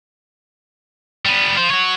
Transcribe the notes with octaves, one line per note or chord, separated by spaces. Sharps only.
G3 B3
F4 C5
F#4 C#5